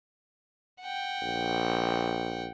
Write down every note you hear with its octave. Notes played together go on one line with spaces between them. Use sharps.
F#5 G5
A#1